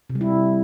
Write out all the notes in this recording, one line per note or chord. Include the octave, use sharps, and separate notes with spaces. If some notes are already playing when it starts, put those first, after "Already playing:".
C3
G3
E4